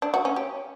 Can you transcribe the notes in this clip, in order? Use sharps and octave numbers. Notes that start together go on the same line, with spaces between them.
D4
F#4
C#4
G4